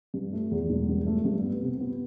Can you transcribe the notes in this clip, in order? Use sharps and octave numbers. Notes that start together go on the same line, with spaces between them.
G2
A3
E2
E1
G2
A3
G2
B3
C3
B3